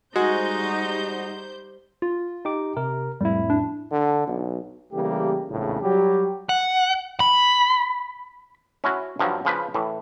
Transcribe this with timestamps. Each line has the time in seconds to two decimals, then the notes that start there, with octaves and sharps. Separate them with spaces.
0.16 G3 G#3 D#4 F#4 C5 G6
2.02 F4
2.45 D#4 G4 D6
2.77 C3 A#4
3.21 F2 A2 G3 E4
3.50 D4
3.92 D3
4.27 B1
4.92 C#3 E3 G3 A3 A#3 G4
5.49 A#1 E2 A2 C#3
5.82 F#3 G3 G4
6.49 F#5
7.20 B5
8.84 C#4 E4 F#4
9.19 G2 F3 F#3
9.45 C#3 F3 B4
9.74 A2 E3